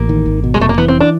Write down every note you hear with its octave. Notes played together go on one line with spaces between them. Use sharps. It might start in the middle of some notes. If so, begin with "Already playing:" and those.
Already playing: A1 A#3
D#3
G#1
B2
G#3
F1 A3
A#3
E3 B3
C4
D4